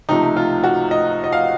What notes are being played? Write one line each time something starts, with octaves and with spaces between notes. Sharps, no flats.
C#2 C3 F3 A3 D#4
F4
F#4
D#5
D#5
F5